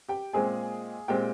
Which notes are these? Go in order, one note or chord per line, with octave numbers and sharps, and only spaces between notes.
G4 G5
A#2 G#3 C4 G#4 G#5
A#2 G#3 C4 G4 G5